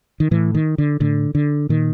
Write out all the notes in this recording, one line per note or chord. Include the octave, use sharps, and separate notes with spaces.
D#3
A2 E3
D#3
D3
A2 D3
D3
A#2 D#3